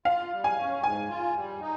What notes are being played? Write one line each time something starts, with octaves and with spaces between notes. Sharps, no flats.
F4 F5
G3
G#5
C#4
G#2 G#5
F4
G3
D#4